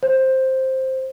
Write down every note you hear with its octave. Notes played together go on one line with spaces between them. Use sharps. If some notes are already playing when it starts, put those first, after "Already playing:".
C5